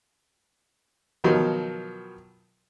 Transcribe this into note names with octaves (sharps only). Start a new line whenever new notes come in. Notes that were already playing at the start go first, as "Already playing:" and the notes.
B2 D#3 F3 F#3